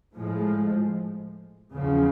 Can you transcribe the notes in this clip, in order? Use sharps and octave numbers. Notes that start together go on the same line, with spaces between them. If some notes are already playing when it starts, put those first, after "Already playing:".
A2 F3 G#3
E2 C#3 F3